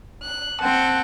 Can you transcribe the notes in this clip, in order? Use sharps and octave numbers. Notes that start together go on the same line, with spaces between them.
F#6
C4 F#5 G5 A5